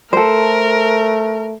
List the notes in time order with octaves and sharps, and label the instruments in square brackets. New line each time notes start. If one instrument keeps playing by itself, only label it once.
[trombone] A3 [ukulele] A4 C5 [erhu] A#4